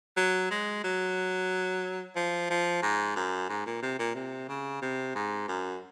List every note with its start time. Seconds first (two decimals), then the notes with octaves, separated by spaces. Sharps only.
0.17 F#3
0.51 G#3
0.84 F#3
2.16 F3
2.50 F3
2.83 G#2
3.16 F#2
3.49 G#2
3.66 A#2
3.83 C3
3.99 A#2
4.15 C3
4.49 C#3
4.82 C3
5.15 G#2
5.48 F#2